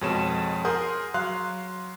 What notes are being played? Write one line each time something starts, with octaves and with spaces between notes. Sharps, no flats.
F2 B2 G#3 C#5 E7
G#4 A#4 F#5 C6 D#6 G6
F#3 F5 C6 F#6